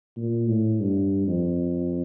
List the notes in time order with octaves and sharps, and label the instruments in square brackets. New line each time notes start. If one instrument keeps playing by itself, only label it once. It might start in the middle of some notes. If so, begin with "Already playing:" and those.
[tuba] A#2
A2
G2
F2